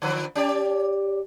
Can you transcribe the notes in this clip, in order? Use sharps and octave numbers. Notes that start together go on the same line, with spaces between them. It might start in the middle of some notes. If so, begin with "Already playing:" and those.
D3 F3 B4
C#4 G4 D5